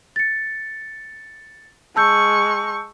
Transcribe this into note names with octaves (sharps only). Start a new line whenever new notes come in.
A6 C#7
G#3 A5 C#6 E6 G6